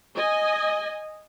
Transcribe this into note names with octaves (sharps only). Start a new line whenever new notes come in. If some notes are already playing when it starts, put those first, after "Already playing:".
D#5 G#5